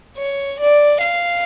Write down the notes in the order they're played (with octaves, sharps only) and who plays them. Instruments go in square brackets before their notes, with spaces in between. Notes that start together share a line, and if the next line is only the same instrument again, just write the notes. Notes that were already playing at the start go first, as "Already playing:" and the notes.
[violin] C#5
D5
F5